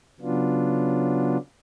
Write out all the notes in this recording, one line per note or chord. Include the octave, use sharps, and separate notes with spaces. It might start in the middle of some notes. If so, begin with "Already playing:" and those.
C#3 F#3 B3 D4 F4